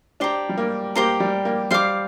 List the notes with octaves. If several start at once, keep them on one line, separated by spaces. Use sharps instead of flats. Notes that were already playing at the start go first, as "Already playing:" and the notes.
D4 G4 C5 A#5
G3
A#3
A#3 G4 C5 A#5
G3
A#3
G3 C5 F5 D6